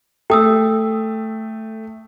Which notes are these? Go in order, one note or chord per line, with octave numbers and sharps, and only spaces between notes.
A3 G5 D#6 E6